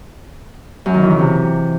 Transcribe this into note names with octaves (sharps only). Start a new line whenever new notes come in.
F#2
D#3
E3
C#3
C3